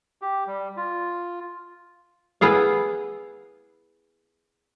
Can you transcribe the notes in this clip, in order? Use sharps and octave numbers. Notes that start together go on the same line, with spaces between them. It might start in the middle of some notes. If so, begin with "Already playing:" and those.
G4
G3
F4
B3 E4 G#4 F5